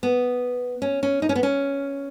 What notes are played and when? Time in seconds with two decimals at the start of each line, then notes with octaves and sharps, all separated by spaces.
0.03 B3
0.82 C#4
1.03 C#4
1.22 D#4
1.29 C#4
1.35 B3
1.43 C#4